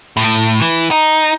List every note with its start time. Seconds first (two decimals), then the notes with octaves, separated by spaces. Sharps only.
0.17 A2
0.61 E3
0.91 D#4